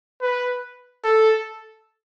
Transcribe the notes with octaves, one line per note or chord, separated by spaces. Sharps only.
B4
A4